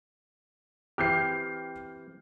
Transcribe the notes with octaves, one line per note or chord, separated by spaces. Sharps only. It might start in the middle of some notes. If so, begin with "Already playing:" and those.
E3 C4 G4 F6 G6 C7